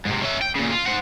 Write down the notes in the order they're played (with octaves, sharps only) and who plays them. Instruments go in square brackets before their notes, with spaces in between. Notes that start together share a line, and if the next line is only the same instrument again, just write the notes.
[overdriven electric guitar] G#2 C3
C#4 E5
G5
A#2 C#3
F4
C5 F#5